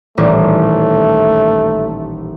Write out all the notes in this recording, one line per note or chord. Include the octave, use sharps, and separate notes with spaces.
D#1 A1 A3